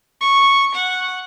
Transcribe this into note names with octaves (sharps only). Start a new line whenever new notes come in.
C#6
F#5